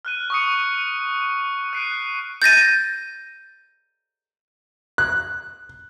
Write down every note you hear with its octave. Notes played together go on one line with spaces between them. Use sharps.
F6 F#6 D#7
C#6 D#6 C#7
F#6 C7 D7 D#7
G6 A6 A#6 D#7
F#6